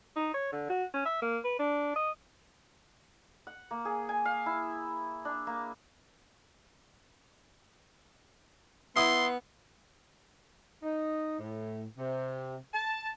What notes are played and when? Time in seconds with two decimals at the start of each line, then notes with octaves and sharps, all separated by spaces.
0.16 D#4
0.34 C#5
0.53 D3
0.70 F#4
0.94 C#4
1.06 E5
1.22 A#3
1.44 B4
1.59 D4
1.96 D#5
3.47 F#5
3.71 A#3
3.85 G#4
4.09 G#5
4.25 F5
4.46 E4
5.25 D4
5.47 A#3
8.96 B3 E4 C6 D#6
10.83 D#4
11.39 A2
11.98 C3
12.74 A5